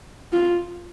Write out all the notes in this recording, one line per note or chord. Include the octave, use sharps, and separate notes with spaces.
F4